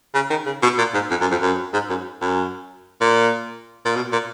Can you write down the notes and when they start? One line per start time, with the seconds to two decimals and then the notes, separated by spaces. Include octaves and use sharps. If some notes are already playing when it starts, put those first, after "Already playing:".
0.15 C#3
0.30 D#3
0.46 C#3
0.63 B2
0.78 A#2
0.94 G#2
1.10 F2
1.21 F#2
1.31 F2
1.42 F#2
1.74 G#2
1.90 F#2
2.21 F#2
3.01 A#2
3.85 A#2
3.96 B2
4.12 A#2